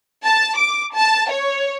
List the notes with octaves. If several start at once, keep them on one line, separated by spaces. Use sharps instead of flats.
A5
D6
A5
C#5